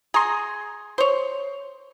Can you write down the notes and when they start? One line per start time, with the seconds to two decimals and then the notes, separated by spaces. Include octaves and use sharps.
0.14 G#4 A#5 C6
0.98 C5 C#5